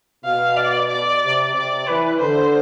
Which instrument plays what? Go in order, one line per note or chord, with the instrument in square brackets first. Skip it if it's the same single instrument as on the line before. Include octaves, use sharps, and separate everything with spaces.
[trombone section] B2 [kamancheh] F5
[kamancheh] D5
D5
[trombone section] C3
[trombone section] C3 [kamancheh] D5
[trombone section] E3 [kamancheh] B4
[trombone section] D3 [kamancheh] C5